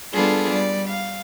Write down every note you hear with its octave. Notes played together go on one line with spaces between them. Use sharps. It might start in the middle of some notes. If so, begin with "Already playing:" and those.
G3 B3 D4 F4 G#4 A4
G3 D5
F5